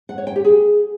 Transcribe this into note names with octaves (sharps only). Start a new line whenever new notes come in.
F#5
C#5
G5
G4
G#4